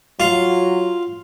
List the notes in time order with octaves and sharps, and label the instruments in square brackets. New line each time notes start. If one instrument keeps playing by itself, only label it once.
[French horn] F#3 [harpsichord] F4